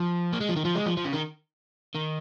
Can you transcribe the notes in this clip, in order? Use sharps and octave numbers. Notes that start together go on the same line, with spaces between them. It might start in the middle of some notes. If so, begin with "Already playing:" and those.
Already playing: F3
A#3
G#3
F3
D#3
F3
G#3
F3
F3
C#3
D#3
D#3